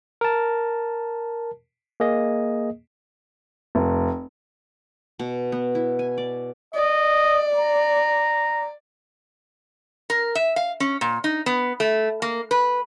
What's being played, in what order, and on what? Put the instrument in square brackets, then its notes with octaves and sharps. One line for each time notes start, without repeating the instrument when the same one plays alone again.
[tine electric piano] A#4 A5
A#3 G#4 D#5
[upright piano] F1
[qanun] B2
B3
E4
G#5
D5
[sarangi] D5 [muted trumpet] D#5
[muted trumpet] A#5
[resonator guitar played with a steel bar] A#4
E5
F5
C#4
A#2
D#4
B3
A3
A#3
B4